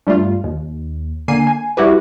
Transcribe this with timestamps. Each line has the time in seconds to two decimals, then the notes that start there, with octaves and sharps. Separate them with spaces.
0.07 G2 G3 A3 F4
0.44 D#2
1.28 D3 A#3 G#5 C7 D#7
1.47 G#5
1.77 G3 E4 F#4 G4 B4